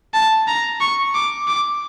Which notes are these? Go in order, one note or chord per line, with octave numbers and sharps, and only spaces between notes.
A5
A#5
C#6
D6
D6